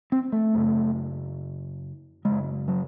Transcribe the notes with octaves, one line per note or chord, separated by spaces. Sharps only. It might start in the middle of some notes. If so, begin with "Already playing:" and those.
C4
A3
F#2 C#3
F#2 C#3 G#3
F#3